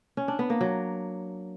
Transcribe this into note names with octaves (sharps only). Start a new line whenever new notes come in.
C#4
D4
B3
A#3
F#3